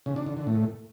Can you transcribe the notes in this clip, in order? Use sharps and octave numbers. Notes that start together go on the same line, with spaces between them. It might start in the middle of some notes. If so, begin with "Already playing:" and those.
C#3
D4
D3
D3
A2